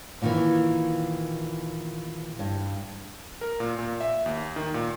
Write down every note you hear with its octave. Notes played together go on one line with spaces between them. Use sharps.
A#2 D#3 E3
G2
A#4
A#2
A#2
E5
D#2
D#3
A#2